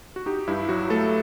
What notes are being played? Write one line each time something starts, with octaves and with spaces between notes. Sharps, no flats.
F#4
D#4 G4
G2 E4
F#3 F#4
A3 A4